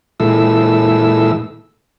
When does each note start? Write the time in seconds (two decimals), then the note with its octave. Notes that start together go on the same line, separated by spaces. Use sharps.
0.20 A#2 E3 G#3 E4 A4 E6